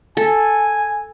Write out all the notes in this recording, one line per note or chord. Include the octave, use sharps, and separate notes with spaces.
A4 G#5